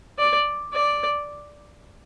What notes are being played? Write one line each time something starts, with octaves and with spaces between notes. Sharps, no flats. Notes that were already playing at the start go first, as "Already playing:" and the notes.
D5
D5